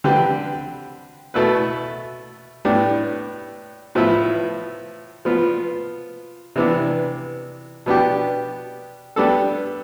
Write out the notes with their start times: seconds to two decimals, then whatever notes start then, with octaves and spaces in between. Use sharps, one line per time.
0.04 D3 G3 C4 G4 B4
1.34 B2 A3 E4 B4
2.65 A2 G3 B3 D4
3.95 A2 F3 B3 E4
5.25 F3 B3 F4
6.56 C3 E3 B3 D4
7.86 B2 B3 D4 G4
9.16 G3 B3 D4 A4